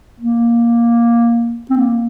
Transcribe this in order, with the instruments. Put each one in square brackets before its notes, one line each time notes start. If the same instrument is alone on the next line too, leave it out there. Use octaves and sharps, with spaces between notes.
[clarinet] A#3
C4
A#3